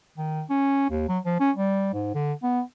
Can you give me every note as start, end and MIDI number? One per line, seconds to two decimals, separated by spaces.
0.18 0.43 51
0.50 0.88 61
0.90 1.07 39
1.09 1.19 54
1.25 1.37 53
1.40 1.51 61
1.57 1.89 55
1.94 2.11 44
2.15 2.33 50
2.43 2.61 59